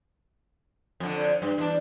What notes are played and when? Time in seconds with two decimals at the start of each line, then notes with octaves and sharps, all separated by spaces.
1.00 F2 D3
1.42 G2
1.58 E2 D4